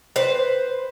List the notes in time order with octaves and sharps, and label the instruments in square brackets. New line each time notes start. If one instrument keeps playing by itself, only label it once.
[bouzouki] B4 C5